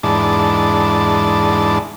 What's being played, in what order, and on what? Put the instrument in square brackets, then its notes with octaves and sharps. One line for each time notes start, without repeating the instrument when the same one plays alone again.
[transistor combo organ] E2 G#2 D4 A5